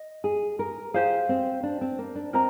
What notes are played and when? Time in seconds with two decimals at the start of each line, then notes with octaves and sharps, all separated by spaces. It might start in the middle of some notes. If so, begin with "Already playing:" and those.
Already playing: D#5
0.24 G#4
0.59 A#4
0.94 G4 G#4 C5 F5
1.29 C4
1.63 D4
1.81 C4
1.98 A#3
2.15 D4
2.33 C4 A#4 D#5 A#5